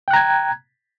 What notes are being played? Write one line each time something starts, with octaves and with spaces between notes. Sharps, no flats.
G5 A#5 F#6 G#6